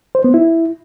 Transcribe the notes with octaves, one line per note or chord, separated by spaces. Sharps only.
C5
B3
E4